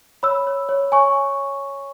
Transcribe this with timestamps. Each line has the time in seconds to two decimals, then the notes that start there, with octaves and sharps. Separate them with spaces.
0.23 C#5 B5 E6
0.47 C#5
0.69 C#5
0.92 C#5 G#5 C#6